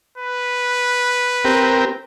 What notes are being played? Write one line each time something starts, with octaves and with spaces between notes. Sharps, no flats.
B4
C4 G4 A#4